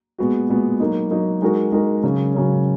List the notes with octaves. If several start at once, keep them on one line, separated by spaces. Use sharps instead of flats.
A#2 G#3 B3 F#4
A#2 G#3 B3 F#4
F#3 A#3 D#4
F#3 A#3 D#4
G#3 D#4 F#4 A#4
G#3 D#4 F#4 A#4
C#3 F#3 C#4
C#3 F#3 C#4